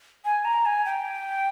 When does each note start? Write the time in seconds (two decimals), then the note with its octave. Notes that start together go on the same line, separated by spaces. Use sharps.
0.25 G#5
0.45 A#5
0.66 G#5
0.86 G5